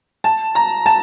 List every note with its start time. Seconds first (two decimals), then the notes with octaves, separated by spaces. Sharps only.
0.24 A5
0.55 A#5
0.86 A5